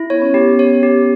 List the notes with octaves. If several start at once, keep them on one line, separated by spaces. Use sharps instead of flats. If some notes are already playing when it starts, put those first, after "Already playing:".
Already playing: E4
B3 C#5
C#4
B3 G4
C#5
G4